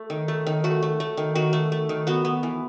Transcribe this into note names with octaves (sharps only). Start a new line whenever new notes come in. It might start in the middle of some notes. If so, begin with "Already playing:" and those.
Already playing: A3
D#3
A3
D#3
A3 F#4
A3
A3
D#3
D#3 F#4
A3
A3
D#3
B3 F#4
B3
E3